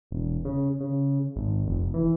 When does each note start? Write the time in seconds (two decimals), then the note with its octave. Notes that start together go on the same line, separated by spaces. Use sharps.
0.11 E1
0.45 C#3
0.80 C#3
1.36 G#1
1.67 F1
1.94 E3